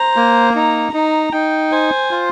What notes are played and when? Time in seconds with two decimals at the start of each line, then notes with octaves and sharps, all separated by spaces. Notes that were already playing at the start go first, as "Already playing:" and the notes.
Already playing: C5 A#5
0.16 A#3
0.55 D#4 A#5
0.94 D#4 A#5
1.33 D#4 G5
1.72 C5 G#5
2.11 F4